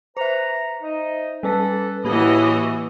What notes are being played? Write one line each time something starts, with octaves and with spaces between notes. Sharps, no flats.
B4 C5 E5 A#5
D#4 D#5
G3 C#4 A4 B4 A5
A2 E3 A#3 F#4 G4 B4 D#5